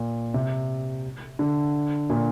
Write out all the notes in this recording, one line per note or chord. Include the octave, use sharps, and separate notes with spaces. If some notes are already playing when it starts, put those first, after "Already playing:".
Already playing: A#2
C3
D3
A#2